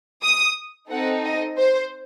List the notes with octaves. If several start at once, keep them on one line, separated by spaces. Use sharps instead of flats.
D#6
C4 D#4 A4 F#5
D#5
C5